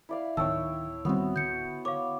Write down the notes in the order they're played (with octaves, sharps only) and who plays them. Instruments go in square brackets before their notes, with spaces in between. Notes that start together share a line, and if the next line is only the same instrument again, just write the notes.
[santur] E4 D5 F5
[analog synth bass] D1 [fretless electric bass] D#3 [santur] C#5 G5 A5 [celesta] E6
[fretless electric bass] D#3 G3 C4 [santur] B3 F#4
[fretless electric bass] D3 [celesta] G6 C#7
[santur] C#5 [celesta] F5 D6